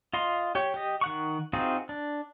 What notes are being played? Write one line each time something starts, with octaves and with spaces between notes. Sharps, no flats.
F4 D#5 C6
G4 C#5
G4 D#5
D#3 F#5 C#6
C4 D#4 F4 F#4 G#4
D4